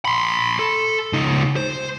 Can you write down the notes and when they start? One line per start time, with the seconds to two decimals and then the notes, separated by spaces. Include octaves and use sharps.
0.05 B5 C6
0.59 A4
1.13 C#2 D#4
1.56 C5